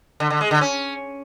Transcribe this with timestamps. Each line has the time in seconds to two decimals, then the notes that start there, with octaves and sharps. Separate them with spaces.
0.20 D3
0.30 D3
0.41 G#3
0.51 D3
0.61 C#4